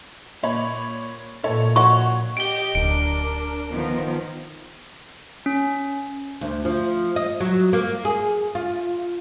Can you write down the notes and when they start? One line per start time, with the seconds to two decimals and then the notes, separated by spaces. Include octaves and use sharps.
0.43 A#2 C#5 B5
1.44 A#2 A4 C#5
1.76 F#4 C#5 F#5 C#6
2.37 G4 D#5 D7 G7
2.75 D1 D4 A#4 D7
3.72 D#3 F3 B3
5.46 C#4
6.41 D2
6.65 F3
7.16 D#5
7.40 F#3
7.73 A#3
8.05 G#4
8.55 F4